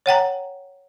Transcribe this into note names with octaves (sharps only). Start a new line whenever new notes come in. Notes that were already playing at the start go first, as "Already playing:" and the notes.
C#5 F#5 G5 A#5